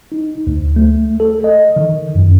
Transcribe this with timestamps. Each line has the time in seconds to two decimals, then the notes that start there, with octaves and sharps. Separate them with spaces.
0.12 D#4
0.47 D2
0.76 A3
1.20 A4
1.44 D#5
1.76 D#3
2.15 F#2